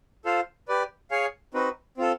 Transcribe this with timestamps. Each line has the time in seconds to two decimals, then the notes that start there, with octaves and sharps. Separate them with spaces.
0.25 F4 A4 C5 F5
0.68 G4 B4 D5
1.11 G#4 C#5 F5 G#5
1.54 C4 D#4 F#4 B4
1.98 C4 F4 A4